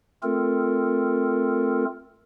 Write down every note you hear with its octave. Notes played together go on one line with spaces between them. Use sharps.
A3 C4 F4 A4 A#4